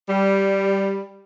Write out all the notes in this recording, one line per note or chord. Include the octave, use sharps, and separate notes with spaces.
G3